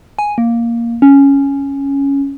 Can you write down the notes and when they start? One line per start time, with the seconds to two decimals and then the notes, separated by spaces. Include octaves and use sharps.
0.19 G#5
0.38 A#3
1.02 C#4